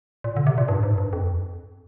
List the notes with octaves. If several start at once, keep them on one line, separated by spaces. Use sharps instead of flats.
A#2
D3
C3
A#2
G2
G#2
G2
F2